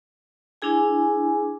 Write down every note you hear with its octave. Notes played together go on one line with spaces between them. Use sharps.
D4 E4 G#4 G#5